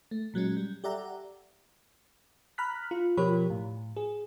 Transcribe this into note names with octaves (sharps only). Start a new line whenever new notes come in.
A3
A#2 F#3 G#3 C#4
G3
G4 A4 D5 E5 F#5 A#5
A#5 B5 F6 F#6 B6
F4
B2 F3 G4 A#4 C#5 B5
A2
G#4